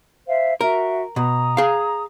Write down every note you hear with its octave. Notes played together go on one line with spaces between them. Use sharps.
C5 E5 F5
F#4 A#4 E5
B2 A#5 D#6
G#4 F5